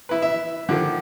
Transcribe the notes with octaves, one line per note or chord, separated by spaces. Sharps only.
E4 B4
E5
D3 D#3 F3